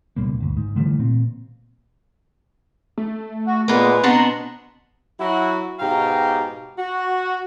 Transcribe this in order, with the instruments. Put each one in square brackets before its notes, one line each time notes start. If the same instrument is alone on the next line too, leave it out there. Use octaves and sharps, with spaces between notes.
[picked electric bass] C#2 B2 G3 A#3
G1 D2
G#2
D3 E3 G3 A3
A#2 C4
[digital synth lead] A3
[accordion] F#4
[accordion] A#2 G#3 [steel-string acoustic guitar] A#3 B3 [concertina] B4
[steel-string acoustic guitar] B2 B3 D4 [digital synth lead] C4 [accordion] A#5 C6
[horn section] F#3 E4 F#4
G#2 B2 G4 F5 G5 A#5
F#4